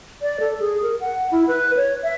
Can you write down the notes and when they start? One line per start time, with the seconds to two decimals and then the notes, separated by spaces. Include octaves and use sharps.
0.22 D5
0.40 A4
0.60 G#4
0.82 A#4
1.01 F#5
1.32 E4
1.48 B4
1.77 C#5
2.04 E5